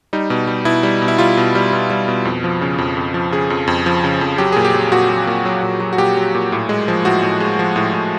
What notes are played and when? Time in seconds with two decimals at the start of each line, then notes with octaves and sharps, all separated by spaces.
0.13 G3 D#4
0.30 B2
0.47 G3
0.65 B2 E4
0.83 G3
1.02 B2
1.08 E4
1.18 G3 F4
1.37 B2
1.55 G3
1.73 B2
1.90 G3
2.08 B2
2.25 F2
2.44 F3
2.61 C#3
2.78 F2
2.97 F2
3.14 F3
3.32 C#3 G#4
3.50 F2
3.67 F2
3.86 F3
4.04 C#3
4.21 F2
4.38 F#3 G4
4.52 A#2 G#4
4.65 G4
4.74 F#3
4.92 A#2 F#4
5.09 F#3
5.27 A#2
5.46 F#3
5.63 A#2
5.80 F#3
5.93 F#4
5.98 A#2 G4
6.17 F#3
6.35 A#2
6.52 A2
6.69 G#3
6.88 F3
7.05 A2 F#4
7.23 A2
7.40 G#3
7.59 F3
7.76 A2
7.93 A2